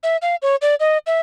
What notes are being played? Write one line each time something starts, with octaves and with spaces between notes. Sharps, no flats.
E5
F5
C#5
D5
D#5
E5